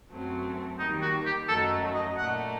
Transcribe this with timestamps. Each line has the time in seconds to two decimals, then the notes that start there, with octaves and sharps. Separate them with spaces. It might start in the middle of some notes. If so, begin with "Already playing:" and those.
0.10 F#2 F#3 A3 C4
0.79 D#2 D#3 G3 D#4
1.02 F#4
1.26 G4
1.48 F#2 F#3 A3 D#4 A4
1.94 D#5
2.17 A#2 A3 D#4 F#5